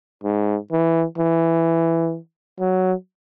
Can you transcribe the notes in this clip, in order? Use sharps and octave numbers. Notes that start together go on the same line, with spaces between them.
G#2
E3
E3
F#3